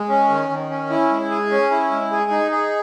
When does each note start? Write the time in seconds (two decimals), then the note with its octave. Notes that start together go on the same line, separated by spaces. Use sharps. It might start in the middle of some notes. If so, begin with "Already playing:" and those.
Already playing: G#3
0.09 C#4
0.29 D#3
0.49 D#3
0.70 C#4
0.90 E4
1.10 G#3
1.30 G#4
1.51 C#4
1.71 E4
1.91 G#3
2.11 G#4
2.31 D#4
2.51 G#4